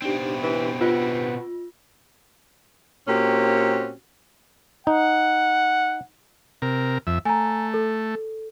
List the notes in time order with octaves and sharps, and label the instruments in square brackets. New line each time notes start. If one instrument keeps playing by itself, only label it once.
[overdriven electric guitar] B2 C4 [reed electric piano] D4 D#4 G4
[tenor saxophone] E3
[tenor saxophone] B3 [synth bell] F4
[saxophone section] A#2 A#3 C4 C#4 F#4 G4
[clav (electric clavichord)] D#4 [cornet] F#5
[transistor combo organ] C3 A#4
F2 E5
[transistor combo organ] A3 [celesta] G#5 A#5
[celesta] A4